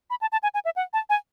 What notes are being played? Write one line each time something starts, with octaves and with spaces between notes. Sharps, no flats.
B5
A5
A5
G#5
G#5
E5
F#5
A5
G#5